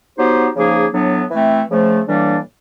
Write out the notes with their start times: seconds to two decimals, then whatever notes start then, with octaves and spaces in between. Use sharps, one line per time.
0.17 F#3 B3 D#4 G4 C5
0.56 C#3 F3 A#3 D#4 G#4
0.93 A2 F#3 B3 D4
1.31 E3 A3 C4
1.70 C#3 F3 A3 C4
2.07 A2 E3 G3 A#3 D4